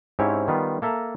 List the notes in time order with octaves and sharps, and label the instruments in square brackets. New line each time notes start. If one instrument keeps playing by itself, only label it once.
[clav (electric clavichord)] G#2 C4 C#4 E4 G4 C#5
D#3 G3 B3 F4
A#3 A4 E5 A5 A#5